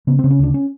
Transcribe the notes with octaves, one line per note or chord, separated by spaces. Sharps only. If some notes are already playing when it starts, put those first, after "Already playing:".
C#3 B3
C#3 C4
C#4
D2 D4
C#4